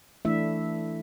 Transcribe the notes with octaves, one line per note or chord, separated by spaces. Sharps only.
E3 A3 D4 E4 E5